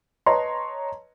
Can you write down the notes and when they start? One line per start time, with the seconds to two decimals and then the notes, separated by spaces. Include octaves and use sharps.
0.26 B4 C#5 D#5 A5 A#5 C6